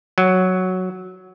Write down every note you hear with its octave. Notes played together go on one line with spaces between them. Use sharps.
F#3